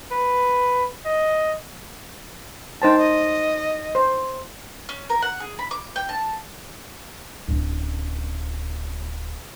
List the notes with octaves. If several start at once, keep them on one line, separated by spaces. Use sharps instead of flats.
B4
D#5
D#4 C5 G5 A5
D#5
C5
C#4
A#4
F#5
G#4
B5
D6
G5
A5
D1 C#3